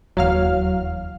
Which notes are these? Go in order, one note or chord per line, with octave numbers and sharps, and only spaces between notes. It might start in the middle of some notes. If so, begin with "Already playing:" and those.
E1 D#2 E3 F#3 F5 F6